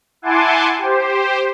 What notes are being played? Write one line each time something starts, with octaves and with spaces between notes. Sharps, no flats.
E4 F#5 G#5 A5 C6 D6
G4 C5